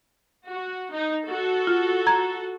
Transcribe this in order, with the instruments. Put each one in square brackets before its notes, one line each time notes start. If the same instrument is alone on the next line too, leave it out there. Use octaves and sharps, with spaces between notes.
[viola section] F#4
D#4
F#4 A4
[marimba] F4
A#5 G#6